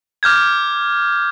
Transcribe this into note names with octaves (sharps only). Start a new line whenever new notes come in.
D6 F6 G6 G#6